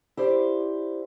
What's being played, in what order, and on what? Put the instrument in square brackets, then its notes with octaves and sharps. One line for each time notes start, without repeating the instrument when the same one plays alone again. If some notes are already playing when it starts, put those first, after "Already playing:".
[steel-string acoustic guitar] E4 G4 C5 D5